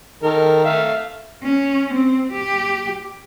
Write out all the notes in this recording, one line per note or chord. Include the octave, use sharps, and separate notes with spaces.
D#3 A4 A#4
A3 E5 F5
C#4
C4
G4